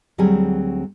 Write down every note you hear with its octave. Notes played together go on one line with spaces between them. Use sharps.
D2 F#3 G3 C4 G#4 G#5